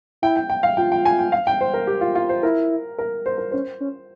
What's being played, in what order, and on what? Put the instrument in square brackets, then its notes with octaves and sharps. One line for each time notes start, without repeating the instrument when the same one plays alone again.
[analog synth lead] E4 [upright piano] G5
[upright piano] G5
G5
F5
[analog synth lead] F4 [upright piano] G5
[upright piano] G5
G#5
G5
F5
G5
C5
A#4
G4
F4
F4
C5
[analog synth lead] E4 [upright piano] A#4
[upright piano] A#4
C5
A#4
[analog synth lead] C#4 [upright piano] C5
[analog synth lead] C#4